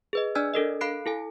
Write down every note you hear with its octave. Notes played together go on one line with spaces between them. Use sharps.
G#4 B4 D#5
D4 D5 G#5 E6 F6 G#6
D4 A4 A#4 D#5
A4 F5 B5 F#6 C7 D7
E4 A4 G#5